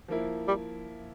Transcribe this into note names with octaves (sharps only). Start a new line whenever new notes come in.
F3 A#3 E4
G3